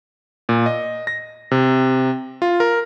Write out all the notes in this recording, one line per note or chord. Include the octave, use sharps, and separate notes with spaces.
A#2
D#5
A#6
C3
F4
A#4